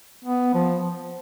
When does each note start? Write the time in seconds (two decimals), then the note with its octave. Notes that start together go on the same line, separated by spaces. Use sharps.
0.25 B3
0.54 F3